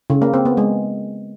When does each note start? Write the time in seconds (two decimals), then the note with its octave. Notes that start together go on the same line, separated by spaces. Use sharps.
0.10 C#3
0.22 A#3
0.34 C4
0.45 B3
0.57 G#3